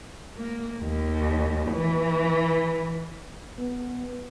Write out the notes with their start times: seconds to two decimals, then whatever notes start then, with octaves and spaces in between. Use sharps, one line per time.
0.38 A#3
0.80 D#2
1.71 E3
3.59 B3